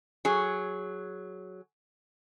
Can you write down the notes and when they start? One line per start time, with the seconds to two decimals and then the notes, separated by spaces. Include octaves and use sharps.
0.25 F#3 G#4